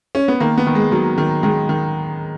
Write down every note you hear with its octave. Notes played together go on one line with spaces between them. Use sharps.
C#4
B3
D#3 A#3
B3
D#3
G#3
D#3 F#3
D#3
D#3 G#3
D#3